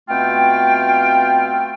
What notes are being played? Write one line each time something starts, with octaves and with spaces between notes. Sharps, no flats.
B2 A3 C4 F4 G5